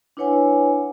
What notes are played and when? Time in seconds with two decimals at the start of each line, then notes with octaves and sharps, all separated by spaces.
0.17 D4 E4 B4 C#5 F#5 G#5